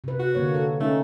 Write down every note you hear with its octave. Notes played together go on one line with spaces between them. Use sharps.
C3 B4
F#4
D3 A#3 C#5
A4
A3 C#4 D#4